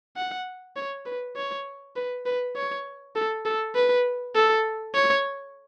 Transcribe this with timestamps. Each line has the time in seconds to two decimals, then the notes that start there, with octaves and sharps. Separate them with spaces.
0.16 F#5
0.76 C#5
1.06 B4
1.36 C#5
1.96 B4
2.26 B4
2.56 C#5
3.16 A4
3.45 A4
3.75 B4
4.35 A4
4.95 C#5